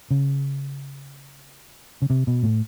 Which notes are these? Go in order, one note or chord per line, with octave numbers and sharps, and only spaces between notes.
C#3
C#3
C3
B2
A2